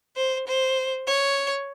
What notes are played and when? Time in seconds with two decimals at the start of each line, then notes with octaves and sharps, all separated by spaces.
0.16 C5
0.47 C5
1.07 C#5